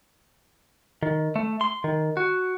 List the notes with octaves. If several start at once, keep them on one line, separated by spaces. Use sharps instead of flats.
D#3
A3
C6
D#3
F#4